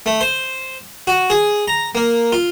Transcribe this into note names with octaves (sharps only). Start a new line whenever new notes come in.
A3
C5
F#4
G#4
A#5
A#3
F4